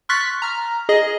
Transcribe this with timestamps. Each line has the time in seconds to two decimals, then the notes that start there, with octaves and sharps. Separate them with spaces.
0.09 C6 C#6 F6 F#6 A6 B6
0.42 A#5 F6
0.89 G#4 D#5